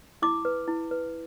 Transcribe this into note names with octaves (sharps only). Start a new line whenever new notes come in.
E4 D6
B4
E4
B4